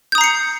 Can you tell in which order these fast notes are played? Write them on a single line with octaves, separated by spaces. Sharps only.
G6 D#6 A#5 C7 C#7